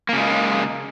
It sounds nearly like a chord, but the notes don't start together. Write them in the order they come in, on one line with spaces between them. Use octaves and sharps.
A#3 C#3 G#3